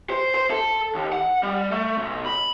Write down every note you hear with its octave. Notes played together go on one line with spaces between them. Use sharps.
C5
C5
A4
D#2
F#5
G3
A3
B1
B5